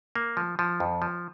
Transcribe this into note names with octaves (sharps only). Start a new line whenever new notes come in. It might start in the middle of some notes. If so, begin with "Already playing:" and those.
A#3
F3
F3
F2
F3